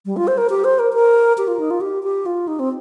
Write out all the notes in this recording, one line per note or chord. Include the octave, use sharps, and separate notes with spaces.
G3
F4
C5
A#4
G4
C5
A#4
A#4
G4
F4
D#4
F4
G4
G4
F4
D#4
C4